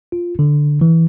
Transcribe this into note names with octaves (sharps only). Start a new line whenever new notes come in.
F4
D3
E3